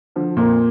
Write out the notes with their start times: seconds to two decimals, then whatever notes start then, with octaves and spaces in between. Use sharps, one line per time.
0.16 D3 F3
0.37 F2 A#2 A#3